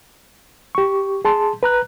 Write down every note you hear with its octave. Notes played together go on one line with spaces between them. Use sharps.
G4 C#6
G#4 A5 C6
B4 A#5 F#6